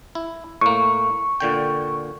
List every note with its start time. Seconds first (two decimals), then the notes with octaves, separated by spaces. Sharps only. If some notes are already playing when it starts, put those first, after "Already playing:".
0.15 E4
0.61 A2 A#3 C#6
1.40 A#2 D3 G5